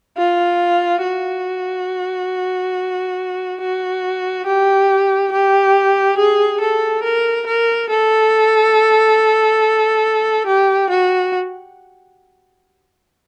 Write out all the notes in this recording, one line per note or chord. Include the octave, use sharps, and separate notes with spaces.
F4
F#4
F#4
G4
G4
G#4
A4
A#4
A#4
A4
G4
F#4